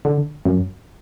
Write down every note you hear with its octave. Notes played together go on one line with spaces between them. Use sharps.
D3
F#2